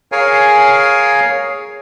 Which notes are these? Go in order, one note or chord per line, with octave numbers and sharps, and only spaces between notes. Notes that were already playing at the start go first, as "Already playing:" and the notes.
G#4 A#4 C#5 F5 G#5